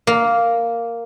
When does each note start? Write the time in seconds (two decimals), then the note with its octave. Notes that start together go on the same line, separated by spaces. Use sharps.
0.07 A#3